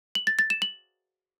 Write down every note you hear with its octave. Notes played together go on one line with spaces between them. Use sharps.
F#7
A6
A6
E7
F#7